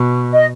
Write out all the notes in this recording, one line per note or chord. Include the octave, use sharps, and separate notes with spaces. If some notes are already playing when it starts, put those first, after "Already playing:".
Already playing: B2
D#5